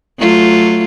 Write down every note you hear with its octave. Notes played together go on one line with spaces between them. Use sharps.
F#3 A3 F4